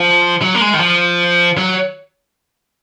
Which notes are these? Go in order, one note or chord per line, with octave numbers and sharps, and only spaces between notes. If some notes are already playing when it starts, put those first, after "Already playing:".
Already playing: F3
F#3
A#3
G#3
D#3
F3
F#3